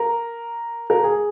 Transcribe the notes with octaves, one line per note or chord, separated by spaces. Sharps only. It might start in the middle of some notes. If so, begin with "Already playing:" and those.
Already playing: A#4
A#4
G#4